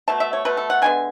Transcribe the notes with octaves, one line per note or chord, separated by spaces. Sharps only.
B2 A3 A5
E5
C#5
B2 A3 B4
A4
F#5
D3 G#3 B3 G#5